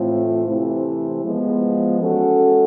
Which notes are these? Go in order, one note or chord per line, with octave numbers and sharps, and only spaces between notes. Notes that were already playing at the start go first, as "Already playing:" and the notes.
Already playing: A2 E3 A3 C4 F4
C3 E3 A3 C4 E4
F3 G#3 B3
E3 G#3 C#4 F#4 A4